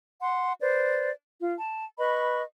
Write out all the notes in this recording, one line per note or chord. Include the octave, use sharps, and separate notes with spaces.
F#5 C6
B4 C5 D5
F4
A5
B4 D#5 B5 C#6